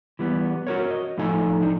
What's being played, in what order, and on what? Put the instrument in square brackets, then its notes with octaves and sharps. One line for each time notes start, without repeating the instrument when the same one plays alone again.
[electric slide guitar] E3 G3 B3
F#4 A#4 C#5
D#5
A2 F3 D#4 A4 G#5
D4 D#4